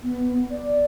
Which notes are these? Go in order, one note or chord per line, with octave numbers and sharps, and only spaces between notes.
B3
D5